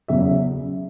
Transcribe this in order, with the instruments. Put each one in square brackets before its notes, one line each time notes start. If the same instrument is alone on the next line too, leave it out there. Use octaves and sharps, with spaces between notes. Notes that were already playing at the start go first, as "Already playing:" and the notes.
[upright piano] E2 C#3 F#3 E5